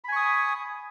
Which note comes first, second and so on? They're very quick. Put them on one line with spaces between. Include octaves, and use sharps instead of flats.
B5 G#5 C#6 D#6